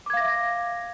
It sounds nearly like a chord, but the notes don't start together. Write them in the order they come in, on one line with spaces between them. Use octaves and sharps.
D6 G#6 F5 A#6 E5